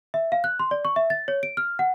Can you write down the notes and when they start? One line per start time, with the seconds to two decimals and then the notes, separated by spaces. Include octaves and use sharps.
0.14 E5
0.32 F5
0.44 F#6
0.59 C6
0.71 D5
0.85 C#6
0.96 E5
1.10 A6
1.28 C#5
1.43 D7
1.57 F6
1.79 F#5